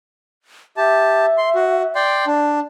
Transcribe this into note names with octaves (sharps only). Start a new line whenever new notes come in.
G4 E5 A5
C6
F#4
D5 G5 C6
D4